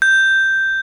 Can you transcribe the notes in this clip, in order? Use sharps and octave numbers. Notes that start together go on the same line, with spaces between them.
G6